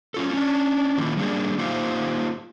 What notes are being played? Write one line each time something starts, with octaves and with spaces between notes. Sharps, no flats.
C#4 F4 A4
C#4 D4
D#3 F3 A#3 E4 F4
G3 A#3 D4 G#4
A#3 D#4 F4 G4 C5 F5